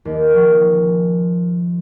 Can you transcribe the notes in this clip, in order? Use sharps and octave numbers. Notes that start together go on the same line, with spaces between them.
D#2
F3